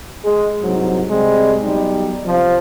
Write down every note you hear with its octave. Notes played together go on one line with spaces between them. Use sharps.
G#3
C2 G#2 F#3
C3 G3 G#3
B1 G3 D#4
C3 F3